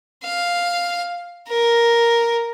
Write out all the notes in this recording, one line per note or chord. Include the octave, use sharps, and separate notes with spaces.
F5
A#4